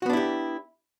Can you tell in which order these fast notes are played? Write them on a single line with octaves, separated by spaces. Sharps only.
F#4 B3 D4 E4 G4